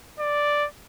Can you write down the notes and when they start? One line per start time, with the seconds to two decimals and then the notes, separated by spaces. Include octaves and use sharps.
0.20 D5